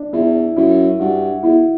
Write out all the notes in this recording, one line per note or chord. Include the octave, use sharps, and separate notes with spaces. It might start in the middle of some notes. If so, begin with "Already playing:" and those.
Already playing: D4
E2 E4
F#2 E4
G2 F#4
E2 E4